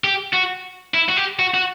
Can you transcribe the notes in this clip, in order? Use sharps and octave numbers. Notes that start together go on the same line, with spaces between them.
G4
F#4
E4
F#4
G4
F#4
F#4